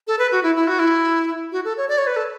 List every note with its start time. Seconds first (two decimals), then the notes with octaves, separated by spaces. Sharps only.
0.07 A4
0.19 B4
0.32 F#4
0.43 E4
0.56 E4
0.67 F#4
0.79 E4
1.52 F#4
1.65 A4
1.77 C#5
1.89 D5
1.98 C#5
2.07 B4
2.16 A4